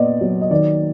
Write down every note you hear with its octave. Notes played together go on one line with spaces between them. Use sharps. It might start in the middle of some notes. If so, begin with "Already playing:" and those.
Already playing: A#2 B3 D5 D#5
F#3
D#5
D#3 D5